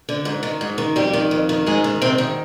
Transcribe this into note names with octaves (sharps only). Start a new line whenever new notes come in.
D3
G#2
D#3
G#2
D#3
F2 G3 G4
D#3
F2
D#3
G#2 G#3 G#4
D#3
G#2 C3 C4
D#3